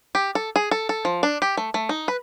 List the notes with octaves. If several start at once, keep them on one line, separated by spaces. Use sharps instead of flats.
G4
A4
G#4
A4
A4
F3
D4
G4
A3
A3
D#4
B4